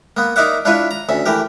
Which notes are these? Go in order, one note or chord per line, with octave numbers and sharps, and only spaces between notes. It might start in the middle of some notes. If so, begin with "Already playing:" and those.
A#3 B3
D#4 A#4 D5 E5 F#5
D4 E4 F4 B4 C#5 E5
A#5
D2 C#4 E5
E3 A3 G4 A#4